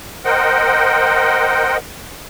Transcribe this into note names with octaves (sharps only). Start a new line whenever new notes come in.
A#4 C5 D#5 F#5 G5